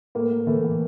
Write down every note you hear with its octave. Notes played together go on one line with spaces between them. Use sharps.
A2 A#3
A2
E3 A3
A2